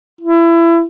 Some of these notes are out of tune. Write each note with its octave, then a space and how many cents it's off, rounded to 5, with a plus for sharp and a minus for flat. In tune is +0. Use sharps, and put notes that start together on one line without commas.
E4 +25